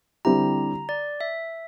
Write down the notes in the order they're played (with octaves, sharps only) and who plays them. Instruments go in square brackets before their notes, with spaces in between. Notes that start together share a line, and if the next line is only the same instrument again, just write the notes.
[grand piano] D3 G3 C4 E4 G4 [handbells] A#5
[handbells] D5
E5